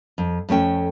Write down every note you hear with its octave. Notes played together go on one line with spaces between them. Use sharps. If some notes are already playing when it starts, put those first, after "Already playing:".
F2
F2 A3 C#4 G5